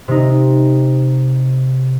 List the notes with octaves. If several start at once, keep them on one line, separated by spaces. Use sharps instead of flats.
C3 D#4